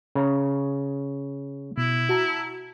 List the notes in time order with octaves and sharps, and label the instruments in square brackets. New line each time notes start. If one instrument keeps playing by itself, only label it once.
[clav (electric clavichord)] C#3 C#4 A#5
[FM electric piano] B2 [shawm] E4
[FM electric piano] F#4 A5 A#5